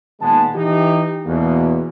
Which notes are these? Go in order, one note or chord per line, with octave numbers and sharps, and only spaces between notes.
A#2 D#3 G#3 B3 A5
E3 D#4 G4
E2 B2 A#3